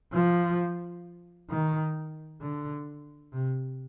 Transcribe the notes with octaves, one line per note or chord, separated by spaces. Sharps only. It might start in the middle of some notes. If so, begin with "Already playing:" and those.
F3
D#3
D3
C3